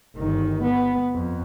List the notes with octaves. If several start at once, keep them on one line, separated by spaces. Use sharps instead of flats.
G1 D#3
B3
F2